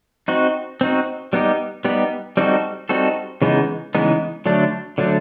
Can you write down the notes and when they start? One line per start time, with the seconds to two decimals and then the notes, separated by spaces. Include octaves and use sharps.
0.28 C4 D#4 F#4
0.81 C4 D#4 F#4
1.33 G3 B3 D#4 G4
1.85 G3 B3 D#4 G4
2.37 G3 C4 D#4 F#4 A4
2.89 G3 C4 D#4 F#4 A4
3.42 C#3 E3 G#3 B3 D#4
3.95 C#3 E3 G#3 B3 D#4
4.46 D3 F#3 A3 D4
4.98 D3 F#3 A3 D4